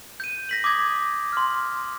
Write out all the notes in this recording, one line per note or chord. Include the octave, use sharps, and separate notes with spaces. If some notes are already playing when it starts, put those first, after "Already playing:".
G6 D#7
A#6 B6 F#7
D6 D#6 G#6 A#6
C6 F6